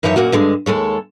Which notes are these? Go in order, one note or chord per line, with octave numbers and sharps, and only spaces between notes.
F#2 E3 F3 D#4 C#5 E5
F#2 A#2 A#3 F#4
G2 D3 G#3
D#2 G#3 A4 C#5